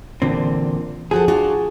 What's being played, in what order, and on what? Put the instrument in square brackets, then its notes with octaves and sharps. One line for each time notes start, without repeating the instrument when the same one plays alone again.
[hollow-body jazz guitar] E2 D3 C4 [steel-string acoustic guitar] A#2
[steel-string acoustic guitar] F3 F#4 A4 [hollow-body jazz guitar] G#4
[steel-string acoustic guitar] D4 F4 F#4